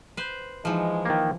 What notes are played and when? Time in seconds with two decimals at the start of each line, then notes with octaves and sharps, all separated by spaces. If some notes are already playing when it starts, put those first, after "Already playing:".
0.17 B4 C5
0.65 E3 F3 G#3 D#4
1.05 D#3 A#3